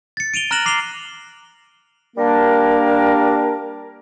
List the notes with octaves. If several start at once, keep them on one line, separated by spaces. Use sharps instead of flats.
A6 C#7
D7 D#7 F7 G7
A#5 F6 F#6 A#6 E7 F#7
D6 C7 E7 F7 G7
G3 A#3 D4 A#4